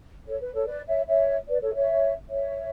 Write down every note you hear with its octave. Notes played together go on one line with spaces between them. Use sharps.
A4 C#5
B4
A4 C#5
B4 D5
C#5 E5
C#5 E5
B4 D5
A4 C#5
C#5 E5
C#5 E5